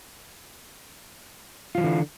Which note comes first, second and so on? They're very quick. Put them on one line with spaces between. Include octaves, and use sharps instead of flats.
F4 F#3 E3 D3